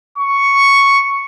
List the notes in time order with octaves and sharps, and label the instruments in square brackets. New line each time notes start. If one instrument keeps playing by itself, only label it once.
[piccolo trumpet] C#6